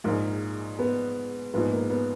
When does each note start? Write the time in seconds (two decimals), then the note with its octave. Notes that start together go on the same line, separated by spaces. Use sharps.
0.04 A#1 G#2 F3 A#3
0.79 B3
1.54 A#1 G#2 F3 B3
1.71 A#3
1.90 B3